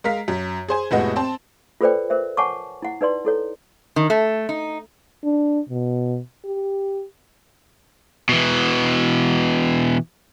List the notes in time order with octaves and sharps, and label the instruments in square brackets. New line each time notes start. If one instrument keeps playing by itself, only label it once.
[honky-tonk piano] G#3 A#4 F5 B6
F#2
G#4 C5 G#5
F1 A2 G#3 B3 F#4 D#5
C4 C5 A5
[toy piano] F4 A4 B4 C5 D5 G5
A#4 C5 E5
C#5 F#5 G#5 A5 C#6 D6
E4 F#5
D#4 B4 D5 C6
E4 A4 C#5
[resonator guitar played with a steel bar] D#3
A3
D#4
[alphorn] D4
B2
G4
[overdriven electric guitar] B2 E3